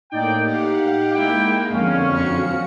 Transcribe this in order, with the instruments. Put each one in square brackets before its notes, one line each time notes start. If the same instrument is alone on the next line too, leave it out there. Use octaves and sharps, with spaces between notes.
[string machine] A2 A#3 [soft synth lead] D#4 [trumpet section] G#4 D5 G5
[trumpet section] G4 [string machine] F5 F#5
[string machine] G#3 A#3 [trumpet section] E4 G5
[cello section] F2 [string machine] D3 [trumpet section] C#4 [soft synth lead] F5
[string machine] F#4 C#7